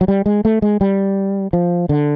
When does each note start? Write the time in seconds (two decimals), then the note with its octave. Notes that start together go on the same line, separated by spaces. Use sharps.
0.01 F#3
0.08 G3
0.26 G#3
0.45 A3
0.62 G#3
0.81 G3
1.53 F3
1.89 D3